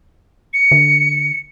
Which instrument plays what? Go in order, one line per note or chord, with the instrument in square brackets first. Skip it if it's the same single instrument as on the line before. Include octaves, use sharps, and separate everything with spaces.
[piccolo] C#7
[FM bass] D3